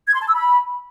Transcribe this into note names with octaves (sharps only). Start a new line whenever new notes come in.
G#6
C6
A5
E6
B5